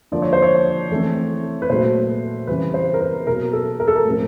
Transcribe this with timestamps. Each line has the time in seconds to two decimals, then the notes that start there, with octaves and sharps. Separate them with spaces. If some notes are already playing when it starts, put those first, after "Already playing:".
0.12 D3 F3 A#3 D5
0.22 C#5
0.33 C5
0.42 C#5
0.91 E3 A3 C4
1.62 B4
1.70 A#2 F#3 A3 C5
2.47 C#3 E3 G3 C4 B4
2.74 C5
2.94 A#4
3.01 B4
3.27 B2 F#3 A#3 A#4
3.53 A4
3.80 A#4
3.88 A4
3.96 A#4
4.05 A2 F3 A3 C4